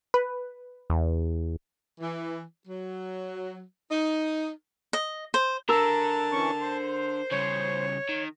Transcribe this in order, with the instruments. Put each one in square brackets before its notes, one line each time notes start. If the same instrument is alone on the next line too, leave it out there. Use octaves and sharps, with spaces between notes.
[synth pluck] B4
[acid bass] E2
[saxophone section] E3
F#3
D#4
[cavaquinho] D#5
C5
[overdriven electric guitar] D3 [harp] A#4 E6 [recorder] A5
[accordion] E3 C#4 C#6
C5
[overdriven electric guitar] C#3 G3 [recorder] C#5
[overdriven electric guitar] D#3